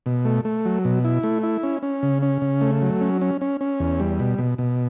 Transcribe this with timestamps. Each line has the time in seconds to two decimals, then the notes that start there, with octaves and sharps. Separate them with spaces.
0.06 B2
0.25 A3
0.45 A3
0.65 F#3
0.85 B2
1.05 E4
1.23 A3
1.43 E4
1.63 C#4
1.83 C#4
2.03 C#3
2.22 C#4
2.42 C#3
2.61 A3
2.82 F#3
3.01 C#4
3.21 C#4
3.41 C#4
3.61 C#4
3.80 E2
4.00 G3
4.20 B2
4.38 B2
4.58 B2